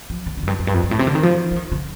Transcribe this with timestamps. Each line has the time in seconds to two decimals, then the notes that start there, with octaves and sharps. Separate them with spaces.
0.10 F3
0.26 D#3
0.37 D3
0.43 F2
0.47 G2
0.59 F2
0.67 G2
0.74 F2
0.83 G2
0.91 A2
0.99 C3
1.07 D3
1.15 D#3
1.23 F3
1.51 F3
1.56 D#3
1.72 D3